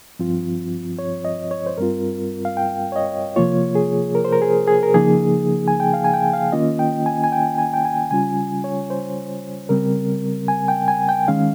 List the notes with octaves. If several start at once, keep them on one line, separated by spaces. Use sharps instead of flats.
G2 F3 C4 F4
C#5
D#5
C#5
C5
G2 G3 C4 F4 A#4
F5
G5
C#5
D#5
C3 F3 A#3 F4 C#5
G#4
A#4
C5
A#4
G#4
G#4
A#4
C#3 F3 A#3 D#4 G#4
G#5
G5
F5
G#5
G5
F5
D#3 A#3 C#4 F4 D#5
G5
G#5
G#5
G5
G#5
G5
G#5
C#3 G3 C#4 F4 G#5
C#5
C5
C#3 G3 C4 A#4
G#5
G5
G#5
G5
D#3 G#3 C#4 F5